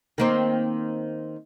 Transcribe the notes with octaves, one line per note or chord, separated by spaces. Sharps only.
D#3 A#3 C4